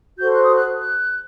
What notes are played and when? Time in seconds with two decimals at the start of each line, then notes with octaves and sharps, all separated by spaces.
0.19 F#4 A4 C5 G6
0.31 F#6
0.43 D#6
0.55 F#6
0.79 F#6